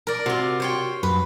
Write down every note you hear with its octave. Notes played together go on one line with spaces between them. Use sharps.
A#4 D5
C3 F4 F#4
C5 C#5 G5
F#2 B4